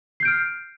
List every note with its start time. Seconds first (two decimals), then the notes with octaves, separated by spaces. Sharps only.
0.20 C7
0.23 G6
0.25 D7
0.28 F6